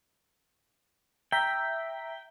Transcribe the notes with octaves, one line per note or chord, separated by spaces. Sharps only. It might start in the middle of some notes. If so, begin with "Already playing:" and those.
E5 G5 A#5 B6